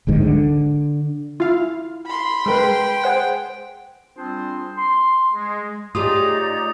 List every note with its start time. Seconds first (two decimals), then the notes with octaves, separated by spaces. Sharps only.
0.07 D1 G#1 G#2 D#3
0.22 D3
1.40 E4 F4 F5
2.06 B5 C6
2.46 G#3 A#4 B4 G5
3.04 G#4 C5 F#5
4.17 G3 C4 D4 F4 G#4 C5
4.78 C6
5.34 G#3
5.95 A3 D#4 F4 G4 G#4 C#5 D5 D#6